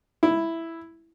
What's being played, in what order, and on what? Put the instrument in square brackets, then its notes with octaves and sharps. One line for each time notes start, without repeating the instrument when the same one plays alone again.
[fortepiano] E4